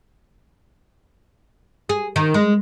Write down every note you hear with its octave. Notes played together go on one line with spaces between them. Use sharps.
G#4
D#3
G#3